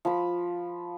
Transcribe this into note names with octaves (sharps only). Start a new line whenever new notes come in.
F3 B5